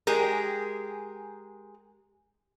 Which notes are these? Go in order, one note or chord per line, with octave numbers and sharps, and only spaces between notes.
G#3 G4 G#4 A#4